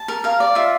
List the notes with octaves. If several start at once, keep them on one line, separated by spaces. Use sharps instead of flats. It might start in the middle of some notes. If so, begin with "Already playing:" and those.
Already playing: A5
A#4
A#4 F5
D5
F4 E5